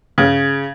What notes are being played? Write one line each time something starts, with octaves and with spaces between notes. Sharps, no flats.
C#3